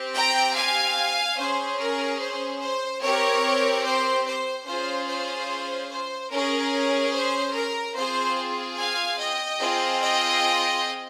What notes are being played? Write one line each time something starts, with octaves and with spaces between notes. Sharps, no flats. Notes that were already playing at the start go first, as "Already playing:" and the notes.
Already playing: C4 G4
G5 A#5
F5 G#5
C#4 G#4 C5
A#4
C5
C5
C4 G4 A#4 C#5
C5
C5
C#4 F4 G#4 C5
C5
C5
C#4 G#4 A#4
C5
A#4
C4 F4 G#4 C5
F5 G#5
D#5 G5
C4 F4 G#4
D#5 G5